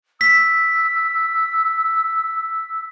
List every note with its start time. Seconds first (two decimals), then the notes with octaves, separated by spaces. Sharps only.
0.21 E6 B6